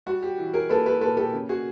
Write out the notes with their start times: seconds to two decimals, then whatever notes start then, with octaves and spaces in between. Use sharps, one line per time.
0.06 G3 F#4
0.22 G4
0.38 E3
0.53 G#4 A#4
0.69 A#3 A4 B4
0.86 A4 B4
1.01 A#3 A4 B4
1.17 G4 A4
1.33 C#3
1.49 F#4 G#4